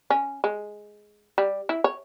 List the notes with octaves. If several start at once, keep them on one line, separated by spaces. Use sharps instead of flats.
C#4
G#3
G3
E4
C#5